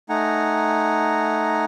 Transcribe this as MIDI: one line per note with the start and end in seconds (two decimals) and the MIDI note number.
0.10 1.65 57
0.10 1.65 63
0.10 1.65 78
0.10 1.65 80
0.10 1.65 82